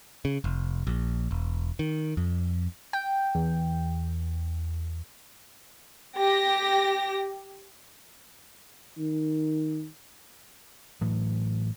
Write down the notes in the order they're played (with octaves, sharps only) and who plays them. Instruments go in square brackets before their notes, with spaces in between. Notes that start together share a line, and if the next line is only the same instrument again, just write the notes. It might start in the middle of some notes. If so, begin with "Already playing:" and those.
[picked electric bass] C#3
F1
A#1
E1
D#3
F2
[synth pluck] G5
E2
[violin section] G4 A#6
[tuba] D#3
[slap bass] A2 E3 F#3